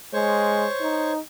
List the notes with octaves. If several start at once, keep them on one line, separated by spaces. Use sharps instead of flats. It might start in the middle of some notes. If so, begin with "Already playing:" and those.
G#3 C5 C#5 C#6
D#4